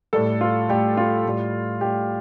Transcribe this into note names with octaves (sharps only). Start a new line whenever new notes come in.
A2 G3 A4
F4
A2 G3 G4
F4
A2 G3
A2 G3 G4